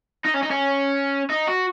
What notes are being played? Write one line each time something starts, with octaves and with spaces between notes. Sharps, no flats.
D#4
C#4
D#4
C#4
D#4
F#4